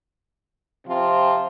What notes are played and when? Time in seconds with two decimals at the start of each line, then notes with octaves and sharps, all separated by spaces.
0.86 C3 F3 C4 F4